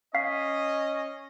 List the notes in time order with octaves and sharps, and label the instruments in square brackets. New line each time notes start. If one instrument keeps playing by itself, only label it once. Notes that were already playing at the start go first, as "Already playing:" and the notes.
[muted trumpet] C#4 [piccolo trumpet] D#5 [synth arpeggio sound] F5 [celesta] B6 C7